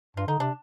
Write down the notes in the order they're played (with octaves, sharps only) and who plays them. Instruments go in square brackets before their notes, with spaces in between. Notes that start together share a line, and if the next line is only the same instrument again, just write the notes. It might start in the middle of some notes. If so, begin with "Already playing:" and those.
[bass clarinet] G2 [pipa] F4
[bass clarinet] D3 [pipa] D#4
[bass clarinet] C3 [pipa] D4